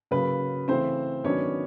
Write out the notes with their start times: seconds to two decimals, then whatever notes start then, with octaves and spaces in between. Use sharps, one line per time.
0.11 C#3 F#3 A#3 B4
0.68 C#3 E3 A3 C4 C5
1.24 D#3 F#3 B3 C#4 D4 C#5